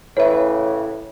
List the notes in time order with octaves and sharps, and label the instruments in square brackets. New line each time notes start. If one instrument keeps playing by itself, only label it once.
[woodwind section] A2 C#3 E3 [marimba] C#5 E5